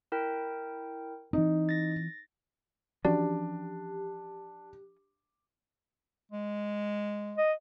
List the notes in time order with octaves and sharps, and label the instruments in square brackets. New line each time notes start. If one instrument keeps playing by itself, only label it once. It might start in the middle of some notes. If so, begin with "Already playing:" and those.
[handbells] E4 A#4 G5
[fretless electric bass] E3 C4 [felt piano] D#4
[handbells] A6 A#6
[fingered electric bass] E3 F3 C#4 [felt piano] D4 [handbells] F#4 D5 [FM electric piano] G4
[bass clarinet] G#3
[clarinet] D#5